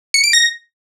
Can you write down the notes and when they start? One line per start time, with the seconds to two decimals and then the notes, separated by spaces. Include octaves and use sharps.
0.14 C#7
0.24 D7
0.33 A#6